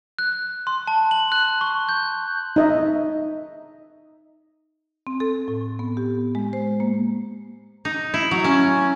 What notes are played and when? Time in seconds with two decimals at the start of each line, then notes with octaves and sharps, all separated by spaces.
0.19 F#6
0.67 C6
0.87 A5
1.11 F#7
1.32 F#6
1.61 C#6
1.89 G6
2.56 D#4 D#5 E5
5.07 C4
5.20 A4
5.48 A2
5.79 B3
5.97 G4
6.35 G#3
6.53 C5
6.80 A#3
7.85 D#4
8.14 E4
8.31 F#3
8.44 C#4